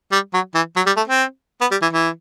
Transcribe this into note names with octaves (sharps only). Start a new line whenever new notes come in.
G3
F#3
E3
F#3
G3
A3
C4
B3
G3
E3
E3